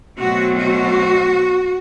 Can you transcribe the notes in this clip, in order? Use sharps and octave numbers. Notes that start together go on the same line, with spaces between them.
B2 F#3 A3 C4 F#4
F#4